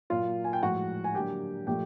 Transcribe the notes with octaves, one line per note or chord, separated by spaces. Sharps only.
A#2 F#3 A#3 F4 F5
G#5
G5
A2 F3 G#3 F#4 F#5
G#5
D3 F#3 A#3 G4 G5
A#2 F3 A3 G4 G5